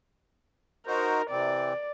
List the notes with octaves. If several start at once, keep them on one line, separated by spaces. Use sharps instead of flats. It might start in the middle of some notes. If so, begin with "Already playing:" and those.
D#4 F#4 A#4 C5
C3 E3 C4 D5